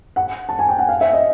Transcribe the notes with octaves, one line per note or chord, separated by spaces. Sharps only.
F#5
A5
G#5
G5
F#5
F5
E5
D#5